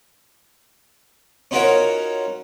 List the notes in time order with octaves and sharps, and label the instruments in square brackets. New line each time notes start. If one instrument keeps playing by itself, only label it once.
[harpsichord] C#4 D#4 F4 F#4 A#4 C#5